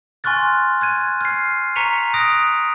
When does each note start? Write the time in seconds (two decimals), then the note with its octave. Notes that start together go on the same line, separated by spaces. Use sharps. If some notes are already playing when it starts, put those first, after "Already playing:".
0.24 G#5 C6 C#6 F6 F#6 A6
0.81 F#6 G#6 D#7
1.21 F6 C7
1.76 A#5 C#6 B6 C#7 D#7 F7
2.14 D#6 F#6 A#6 D7 F7